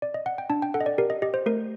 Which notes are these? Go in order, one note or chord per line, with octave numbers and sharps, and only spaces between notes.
D5
D#5
F#5
G5
D4 A5
G5
A4 F#5
D#5
D5
G4 A#4
D#5
G4 D#5
C5
A3 A#4